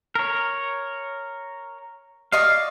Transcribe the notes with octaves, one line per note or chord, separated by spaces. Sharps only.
A#4 C#5
D5 D#5 F5 C#6